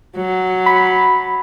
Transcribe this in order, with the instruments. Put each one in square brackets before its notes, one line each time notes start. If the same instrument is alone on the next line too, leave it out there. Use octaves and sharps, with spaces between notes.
[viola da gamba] F#3
[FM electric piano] B5